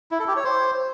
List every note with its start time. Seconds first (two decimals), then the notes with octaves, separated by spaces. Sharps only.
0.11 E4
0.20 A4
0.28 G4
0.36 C#5
0.44 C5